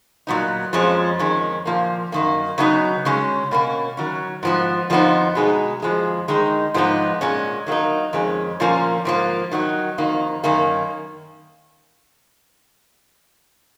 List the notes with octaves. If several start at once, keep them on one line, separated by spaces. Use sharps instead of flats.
A#2 F#3 B3 D#4
F2 F3 G#3 C#4
F2 D#3 G#3 C#4
A#2 F3 A#3
F#2 D#3 A#3
C#3 F#3 B3 D#4
C#3 G#3 C#4
B2 A#3 C#4
D#3 F#3 C#4
G#2 F3 B3
F2 F3 B3 D#4
B2 G#3 D#4
F2 F3 G#3
D#3 G#3 D#4
G#2 F3 B3 D#4
A#2 G#3 C#4
D#3 F#3 A#3 D#4
F2 D#3 G#3 C#4
A#2 F3 A#3 C#4
G#2 F3 A#3
D#3 F#3 B3 D#4
F2 D#3 A#3 D#4
F#2 D#3 A#3 C#4